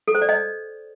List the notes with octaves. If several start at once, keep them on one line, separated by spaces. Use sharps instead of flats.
A4
C5
D5
D#5